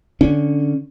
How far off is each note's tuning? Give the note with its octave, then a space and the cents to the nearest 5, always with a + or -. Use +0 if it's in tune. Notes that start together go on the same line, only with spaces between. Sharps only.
D3 +0 C#4 +0